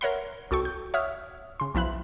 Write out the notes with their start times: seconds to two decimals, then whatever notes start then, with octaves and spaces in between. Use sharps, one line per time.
0.01 A#4 C#5 E5 F#5 B5 C6
0.51 C2 F#4 A4 G5 C#6
0.65 G6
0.94 C#5 E5 F#5 D#6 F6
1.60 C#3 C6
1.75 B1 F3 E4 F#6